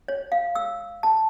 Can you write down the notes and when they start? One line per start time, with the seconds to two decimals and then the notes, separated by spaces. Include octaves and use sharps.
0.08 C#5
0.32 F5
0.55 E6
1.03 A5